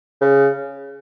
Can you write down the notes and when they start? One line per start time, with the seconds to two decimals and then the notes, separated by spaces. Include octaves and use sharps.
0.21 C#3